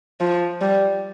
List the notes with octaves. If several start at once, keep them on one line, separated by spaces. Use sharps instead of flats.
F3
G3